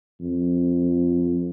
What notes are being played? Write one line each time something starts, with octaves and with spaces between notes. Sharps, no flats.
F2